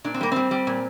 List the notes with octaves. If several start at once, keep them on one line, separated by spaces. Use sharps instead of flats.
A#2 D4
C4
G3 A#3
G3 C4
G3
A#2